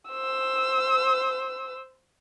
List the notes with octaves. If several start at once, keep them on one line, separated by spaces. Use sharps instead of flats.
C5 E6